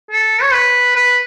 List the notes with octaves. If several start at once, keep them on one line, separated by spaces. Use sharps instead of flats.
A4
C#5
B4
B4